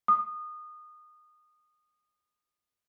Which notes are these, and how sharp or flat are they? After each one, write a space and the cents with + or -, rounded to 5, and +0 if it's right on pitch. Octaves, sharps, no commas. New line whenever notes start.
D#6 -25